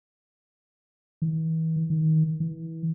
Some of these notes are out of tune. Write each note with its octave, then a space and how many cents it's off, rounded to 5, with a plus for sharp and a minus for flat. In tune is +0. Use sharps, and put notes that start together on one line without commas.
E3 -40
D#3 +20
E3 -25